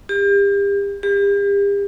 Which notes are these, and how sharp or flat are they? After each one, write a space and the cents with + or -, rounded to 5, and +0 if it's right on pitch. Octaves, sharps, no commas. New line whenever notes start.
G4 +35
G4 +40